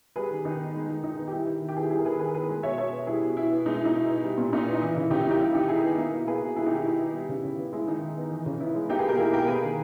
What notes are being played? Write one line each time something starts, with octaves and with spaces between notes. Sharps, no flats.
G3 G#4 B4
D#3
D#3 D#4
B3
G#3
D#3
D#3 D#4
B3
G4
G3 E4
D#3
D#3
G4
B3 E4 G#4
G3 E4 G#4
A#4
D#3 G#4 B4
D#3 G#4 B4
B3 G#4 B4
G#3
B2 C#5 E5
B2 C#5 E5
B3
G3 E4 G#4
B2
B2 E4
B3
G#3 D#4
E4
B2 D#4
B2 E4
B3
G3
A#2
A#2 D#4
B3
D#4
E3 E4
C#3 E4
C#3 D#4 G4
E4
A#3
D#4 G4
G3 E4
D#3 D#4 G4
D#3 E4 G#4
B3
A#3 E4
B2 E4
A#3 G#4 B4
B2
G3 E4 G#4
D#4 G4
D#3 E4
D#3 E4
B3
G3
C#3
C#3
B3
G#3 E4
D#3 D#4
D#3
B3
E3
C#3
B3 E4
G#3
A#3 D#4 G4
G#4 B4
B2 G4 A#4
A#3 E4 G#4
B2 G4 A#4
A#3 G#4 B4
D#3